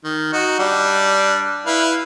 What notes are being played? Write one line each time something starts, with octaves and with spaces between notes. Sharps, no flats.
D#3
D#4 F#4
G3 D4
E4 B4 F5